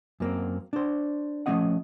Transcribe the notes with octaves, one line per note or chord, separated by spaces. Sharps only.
F#2 A#3 C4
D4 C5
F3 A3 C#4 D#5 F#5